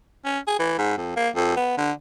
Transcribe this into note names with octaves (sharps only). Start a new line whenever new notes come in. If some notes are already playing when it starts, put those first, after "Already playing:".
C#4
G#4
E3
G#2
F2
A#3
F2
B3
D3